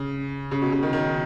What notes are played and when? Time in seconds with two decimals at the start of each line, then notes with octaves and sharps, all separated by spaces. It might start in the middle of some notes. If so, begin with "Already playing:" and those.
Already playing: C#3
0.51 C#3
0.62 B2
0.72 C#3
0.83 D#3
0.93 D#3